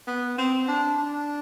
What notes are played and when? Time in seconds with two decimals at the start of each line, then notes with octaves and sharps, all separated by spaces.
0.08 B3
0.38 C4
0.68 D4
0.98 D4